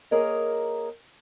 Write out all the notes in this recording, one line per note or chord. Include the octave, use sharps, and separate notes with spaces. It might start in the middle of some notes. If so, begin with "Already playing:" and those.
A#3 G#4 A#4 C#5 D#5